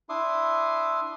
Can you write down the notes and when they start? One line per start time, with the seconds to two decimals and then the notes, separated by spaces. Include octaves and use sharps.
0.09 D4 E4 E5 C6 D6 D#6